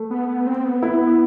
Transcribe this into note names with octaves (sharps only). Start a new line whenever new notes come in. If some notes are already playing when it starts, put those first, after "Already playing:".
Already playing: A3
B3
B3
C4
B3
B3 E4
B3